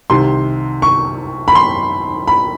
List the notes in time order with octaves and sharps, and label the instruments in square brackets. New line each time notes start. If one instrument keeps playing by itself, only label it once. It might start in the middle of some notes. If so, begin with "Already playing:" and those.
[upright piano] C2 C3 D#3 C6
C#6
B5
C6
B5